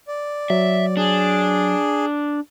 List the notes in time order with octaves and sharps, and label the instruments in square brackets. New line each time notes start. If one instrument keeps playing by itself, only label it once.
[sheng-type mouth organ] D5
[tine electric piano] F#3 [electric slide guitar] E5
[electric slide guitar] D4 [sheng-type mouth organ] G#4